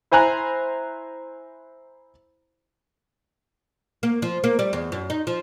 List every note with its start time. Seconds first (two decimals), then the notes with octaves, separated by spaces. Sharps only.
0.11 E4 C5 G#5 A#5 F#6
4.03 A#3
4.22 F3
4.44 A#3
4.59 G3
4.73 E2
4.92 F#2
5.10 D#4
5.27 F3